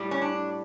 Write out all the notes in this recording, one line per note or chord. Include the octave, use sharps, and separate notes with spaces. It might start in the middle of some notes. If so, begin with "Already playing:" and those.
Already playing: A2 G3
C#4
D4